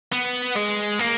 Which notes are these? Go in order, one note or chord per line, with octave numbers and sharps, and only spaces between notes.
B3
G#3
A#3